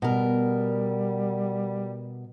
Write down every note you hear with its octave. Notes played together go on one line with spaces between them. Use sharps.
B2 G3 A#4